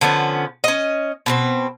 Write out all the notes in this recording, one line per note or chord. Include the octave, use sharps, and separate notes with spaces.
D3 F3 B3 C#4
C#4 D#5
B2 B3 C4